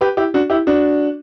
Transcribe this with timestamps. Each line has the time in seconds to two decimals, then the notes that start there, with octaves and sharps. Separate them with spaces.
0.01 G4 B4
0.17 E4 G4
0.34 D4 F#4
0.50 E4 G4
0.67 D4 F#4